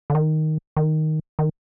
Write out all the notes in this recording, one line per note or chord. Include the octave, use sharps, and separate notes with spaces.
D3
D#3
D#3
D#3